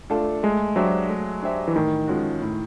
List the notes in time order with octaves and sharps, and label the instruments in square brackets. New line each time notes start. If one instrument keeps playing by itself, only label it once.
[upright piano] A3 D4 F4 A4
[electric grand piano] G#3 [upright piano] A3
[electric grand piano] F#3 [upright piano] D4 G4 C5 E5
[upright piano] A3
D4 G4 C5 E5
[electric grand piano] E3
[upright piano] A2 [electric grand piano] D#3
[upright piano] F3 G#3 C#4 F#4
A2